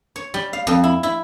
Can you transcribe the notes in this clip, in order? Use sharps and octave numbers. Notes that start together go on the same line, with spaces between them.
C#5
G3
F5
F2
E4
E4